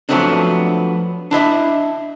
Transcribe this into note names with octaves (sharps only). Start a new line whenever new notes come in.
F3 F#3 A3 B3 C4 D4
D4 E4 D#5 E5